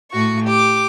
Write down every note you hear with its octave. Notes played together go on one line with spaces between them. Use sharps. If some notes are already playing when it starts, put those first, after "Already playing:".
A2 F#4 C#6
G4 D6